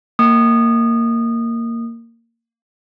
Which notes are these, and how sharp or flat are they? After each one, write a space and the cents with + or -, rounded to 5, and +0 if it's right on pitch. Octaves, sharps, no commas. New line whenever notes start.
A#3 -15 D#6 -20